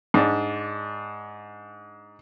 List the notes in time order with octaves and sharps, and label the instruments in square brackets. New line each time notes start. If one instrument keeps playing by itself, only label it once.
[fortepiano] G#2 D4